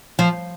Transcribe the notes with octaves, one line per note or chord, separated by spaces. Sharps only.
F3